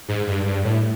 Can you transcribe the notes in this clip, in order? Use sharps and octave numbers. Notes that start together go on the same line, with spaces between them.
G#2
G2
G2
A2